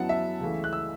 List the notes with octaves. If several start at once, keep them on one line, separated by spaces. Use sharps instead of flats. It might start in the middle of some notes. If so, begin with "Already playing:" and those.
Already playing: F#2 F#3 B3 E4 F#5 A5
E5
C#2 C#3 E3 A3
F#6
E6